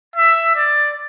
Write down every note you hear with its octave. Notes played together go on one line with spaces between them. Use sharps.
E5
D5